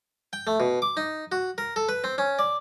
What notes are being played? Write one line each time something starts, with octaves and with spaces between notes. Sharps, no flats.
G5
A3
B2
D6
D#4
F#4
A#4
A4
B4
C4
C#4
D5